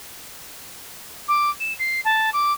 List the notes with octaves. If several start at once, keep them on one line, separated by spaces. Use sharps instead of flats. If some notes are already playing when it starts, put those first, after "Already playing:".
D6
E7
C7
A5
D6